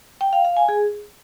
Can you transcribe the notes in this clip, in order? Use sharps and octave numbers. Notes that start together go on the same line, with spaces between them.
G5
F5
F5
G#5
G#4